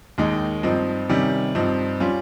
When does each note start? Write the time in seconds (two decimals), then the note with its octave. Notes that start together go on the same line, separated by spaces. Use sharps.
0.18 D#2 D#3 G#3 D#4
0.63 G2 F3 C4 D#4
1.09 C3 D#3 G3 C#4
1.55 G2 F3 C4 D#4
2.00 G3 C#4 F4